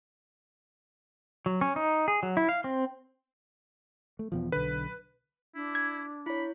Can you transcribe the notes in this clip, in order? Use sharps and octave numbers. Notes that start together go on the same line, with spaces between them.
F#3
C#4
D#4
G#4
F#3
E4
F5
C4
A3
E2 B2 F3
B1 D3 B4
D4 E4
G#6
E4 C#5 B5